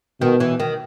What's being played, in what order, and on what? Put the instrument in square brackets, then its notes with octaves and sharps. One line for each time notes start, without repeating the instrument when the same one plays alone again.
[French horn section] B2 [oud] D#3
[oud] E3
D#3